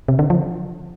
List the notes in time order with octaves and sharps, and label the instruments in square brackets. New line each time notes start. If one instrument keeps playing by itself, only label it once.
[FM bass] C3
D3
F3